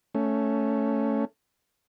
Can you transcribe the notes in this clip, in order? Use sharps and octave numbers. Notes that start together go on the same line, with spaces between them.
A3 C#4